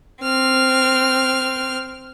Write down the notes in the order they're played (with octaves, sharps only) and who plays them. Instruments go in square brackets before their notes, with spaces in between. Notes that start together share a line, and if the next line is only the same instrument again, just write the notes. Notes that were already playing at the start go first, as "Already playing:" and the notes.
[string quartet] C4 F6